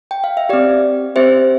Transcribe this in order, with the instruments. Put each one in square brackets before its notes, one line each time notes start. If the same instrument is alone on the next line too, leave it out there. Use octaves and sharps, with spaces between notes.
[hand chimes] G5
F5
E5
C4 G4 D5
C4 G4 C5 E5